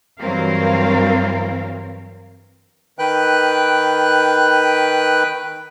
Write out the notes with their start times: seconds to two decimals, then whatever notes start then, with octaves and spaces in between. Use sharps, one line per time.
0.20 G2 E3 F#3 C4 A#4 F5
2.99 D#3 B4 G5 F#6